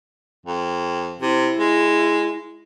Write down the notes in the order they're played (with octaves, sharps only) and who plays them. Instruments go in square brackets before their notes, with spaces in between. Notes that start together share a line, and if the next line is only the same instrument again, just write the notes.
[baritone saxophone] F2
[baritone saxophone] C3 [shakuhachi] E4
[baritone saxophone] G#3